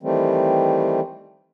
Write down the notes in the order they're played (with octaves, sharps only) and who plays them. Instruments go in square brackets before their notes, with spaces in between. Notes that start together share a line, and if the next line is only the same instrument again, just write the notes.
[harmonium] D#3 E3 G3 A3 C4